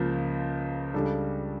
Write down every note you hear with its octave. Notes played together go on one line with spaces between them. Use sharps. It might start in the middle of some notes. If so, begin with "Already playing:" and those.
Already playing: C#2 C#3 F3 A#3
C#2 C#3 G3 D4 A4